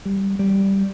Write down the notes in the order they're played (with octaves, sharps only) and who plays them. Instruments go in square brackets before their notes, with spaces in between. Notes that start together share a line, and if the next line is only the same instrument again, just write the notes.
[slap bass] G3
G3